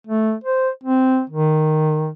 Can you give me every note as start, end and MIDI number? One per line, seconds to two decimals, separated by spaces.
0.07 0.34 57
0.44 0.69 72
0.84 1.21 60
1.30 2.10 51